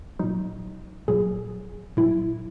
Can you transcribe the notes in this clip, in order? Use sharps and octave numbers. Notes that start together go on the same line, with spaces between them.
A#2 F#3 D#4
A#2 F#3 G#4
A#2 F#3 E4